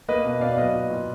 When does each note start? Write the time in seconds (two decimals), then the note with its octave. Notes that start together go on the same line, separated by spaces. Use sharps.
0.08 A#3 B4 D#5
0.25 B2
0.41 B2 D5 F5
0.58 F#3 B4 D#5
0.74 A#2
0.90 A#2